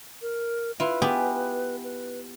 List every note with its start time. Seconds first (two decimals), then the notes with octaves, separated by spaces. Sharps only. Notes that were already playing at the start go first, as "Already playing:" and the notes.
0.22 A#4
0.80 E4 F4 B4
1.02 B3 G4 G#4
1.84 B4